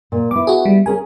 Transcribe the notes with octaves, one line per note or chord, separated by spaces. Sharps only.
A#2
B3 E4 D6
F#4 G#4
G3
C#4 G#4 A#4 G#5